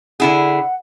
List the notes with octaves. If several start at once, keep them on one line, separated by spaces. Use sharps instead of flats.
D3 E4 G#4 F#5